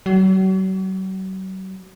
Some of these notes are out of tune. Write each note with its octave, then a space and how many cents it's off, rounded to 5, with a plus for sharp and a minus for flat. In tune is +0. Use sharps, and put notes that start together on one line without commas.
F#3 +40